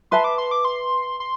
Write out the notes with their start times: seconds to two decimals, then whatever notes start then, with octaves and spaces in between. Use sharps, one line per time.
0.11 B4 E5 A5 C6
0.24 D6
0.38 C6
0.51 D6
0.65 C6
1.20 C6